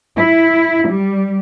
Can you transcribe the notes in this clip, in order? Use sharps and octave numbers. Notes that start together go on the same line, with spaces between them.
E4
G3